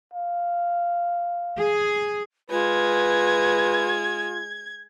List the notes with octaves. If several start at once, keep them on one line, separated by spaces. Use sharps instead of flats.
F5
G#4
G#3 F4 B4 G#6